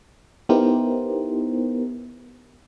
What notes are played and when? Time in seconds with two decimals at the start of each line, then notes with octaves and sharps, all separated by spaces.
0.49 B3 D#4 E4 G4 A#4 C5